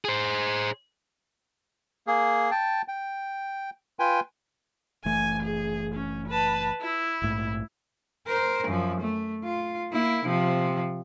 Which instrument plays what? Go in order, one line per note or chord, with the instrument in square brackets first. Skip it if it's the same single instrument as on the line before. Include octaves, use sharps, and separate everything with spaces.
[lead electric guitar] G#4 C5
[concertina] A#3 G#4
G5 A5
G5
F4 B4 G5 G#5
[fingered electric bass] F#1 E3 A3 [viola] G#5
[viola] G#4
C#4
B4 A5
E4
[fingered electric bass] A#1 G#2 A3
[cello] A#4 C5
F#2 F3
A3
F4
A#3 E4
C3 F3